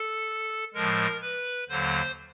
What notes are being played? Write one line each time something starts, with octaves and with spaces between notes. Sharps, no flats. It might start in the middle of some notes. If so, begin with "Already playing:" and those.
Already playing: A4
A2 F3 G#3 A#4
B4
D#2 D3 F#3 C5